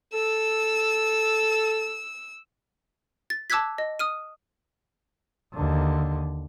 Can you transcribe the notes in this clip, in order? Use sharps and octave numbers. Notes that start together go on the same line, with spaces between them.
A4 E6
A6
A5 D6 E6 F#6 G#6 B6
D#5
D#6 F6 D#7
D#2 D3